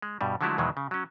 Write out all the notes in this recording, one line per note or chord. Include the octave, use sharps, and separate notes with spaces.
G#3
G2 B2 G3
D3 F3 F#3 G#3 A3 E4
E2 B2 D#3 E3 F#3 G#3
C#3
F#3 C#4